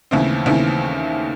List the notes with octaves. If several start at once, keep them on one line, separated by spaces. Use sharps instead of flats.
D#2 C#3 E3 A3 C4
D#2 C#3 E3 A3 C4